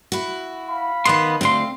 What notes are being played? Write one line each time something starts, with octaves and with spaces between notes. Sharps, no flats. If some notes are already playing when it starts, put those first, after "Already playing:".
E4 F#4
F5 B5
D#3 B3 D#5 A5 C6
D2 C4 F5 C6